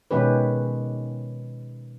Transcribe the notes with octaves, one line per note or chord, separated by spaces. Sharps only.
B2 D#3 G#3 C#4 G4 B4